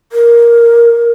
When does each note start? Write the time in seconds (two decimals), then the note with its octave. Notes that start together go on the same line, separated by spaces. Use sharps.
0.12 A#4